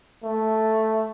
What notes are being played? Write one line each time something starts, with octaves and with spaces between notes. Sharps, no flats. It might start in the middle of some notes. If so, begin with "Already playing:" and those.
A3